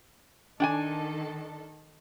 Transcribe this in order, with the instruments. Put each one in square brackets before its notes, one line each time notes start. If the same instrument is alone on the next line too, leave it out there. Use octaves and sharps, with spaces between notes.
[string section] D#3 A4 [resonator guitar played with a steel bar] D4 G5 G#5